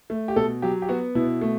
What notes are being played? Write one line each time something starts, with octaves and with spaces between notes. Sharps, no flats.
A3
G4
B2 A4
F#3 G4
G4
B3 F#4
B2 E4
A3